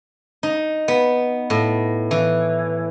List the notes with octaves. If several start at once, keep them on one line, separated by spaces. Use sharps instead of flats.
D#4
B3
A2
E3